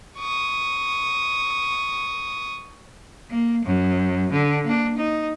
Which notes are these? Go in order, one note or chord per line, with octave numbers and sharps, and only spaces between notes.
C#6 D#6
A#3
F#2
D3
A#3 D4
D#4